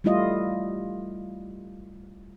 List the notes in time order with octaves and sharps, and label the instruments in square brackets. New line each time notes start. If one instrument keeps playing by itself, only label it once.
[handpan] G3 A3 E4 F4 D#5